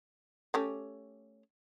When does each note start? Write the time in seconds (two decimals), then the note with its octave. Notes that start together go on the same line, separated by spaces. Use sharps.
0.54 A3 C#4 G4